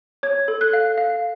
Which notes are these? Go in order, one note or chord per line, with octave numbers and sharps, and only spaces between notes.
C#5 G#6
A4
F#6
F5
F5